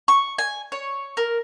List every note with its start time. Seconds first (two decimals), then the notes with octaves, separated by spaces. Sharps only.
0.08 C#6
0.38 G#5
0.72 C#5
1.17 A#4